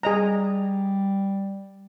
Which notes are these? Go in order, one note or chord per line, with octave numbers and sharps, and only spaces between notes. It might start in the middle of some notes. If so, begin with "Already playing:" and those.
G3 G#4 D#5 A#5